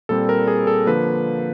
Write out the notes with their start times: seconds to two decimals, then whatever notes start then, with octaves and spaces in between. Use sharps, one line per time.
0.09 A#2 G3 C4 A4
0.29 A#4
0.47 G#4
0.67 A4
0.86 D3 F3 A#3 B4